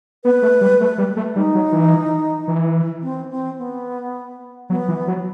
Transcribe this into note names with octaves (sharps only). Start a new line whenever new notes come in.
B3 B4
A3
G3
A3
G3
A3
G3 D#4
F#3
E3
E3
C4
C4
B3
F#3 B3
E3
F#3